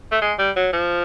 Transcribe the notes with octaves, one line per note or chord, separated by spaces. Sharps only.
A3
G#3
G3
F#3
F3